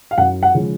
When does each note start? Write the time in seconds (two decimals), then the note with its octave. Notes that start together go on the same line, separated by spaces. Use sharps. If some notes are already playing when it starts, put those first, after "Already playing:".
0.11 F5
0.18 F#2 F#5
0.43 F#5
0.54 C#3 F3 G#3 C#4